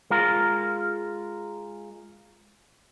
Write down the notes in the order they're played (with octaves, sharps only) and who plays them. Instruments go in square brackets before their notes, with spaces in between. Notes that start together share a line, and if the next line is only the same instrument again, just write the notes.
[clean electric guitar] G#3 F4 A#4